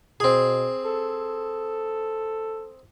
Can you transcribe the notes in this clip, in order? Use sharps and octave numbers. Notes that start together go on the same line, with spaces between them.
B2 C4 G#4
A4